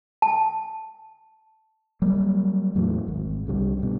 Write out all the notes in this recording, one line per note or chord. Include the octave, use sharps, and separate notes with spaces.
A5
F#3 G3 A#3
E2 A2 E3 F#3
G#1
C2 D3 G3
G2 B2